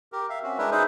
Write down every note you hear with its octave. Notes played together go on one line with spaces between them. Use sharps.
G4 A#4
E5 F5
C4 C#4 F#4
G#3 D4 E4 A#4 B4 E5
D#4 G#4 B4 C5